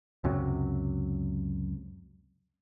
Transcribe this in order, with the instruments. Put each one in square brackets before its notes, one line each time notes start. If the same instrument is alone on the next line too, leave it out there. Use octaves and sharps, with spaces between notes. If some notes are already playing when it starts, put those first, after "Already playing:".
[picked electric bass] C#2 F#2 C3 F#3